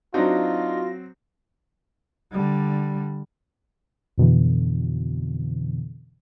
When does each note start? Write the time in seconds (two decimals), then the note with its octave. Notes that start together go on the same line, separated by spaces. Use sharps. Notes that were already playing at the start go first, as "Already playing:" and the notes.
0.14 F#3 C4 D4 D#4 F4 F#4 A#6
2.32 D3 G3
4.18 F2 B2 D3 E3